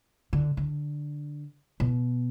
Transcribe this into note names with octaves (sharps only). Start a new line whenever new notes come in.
D3
D3
B2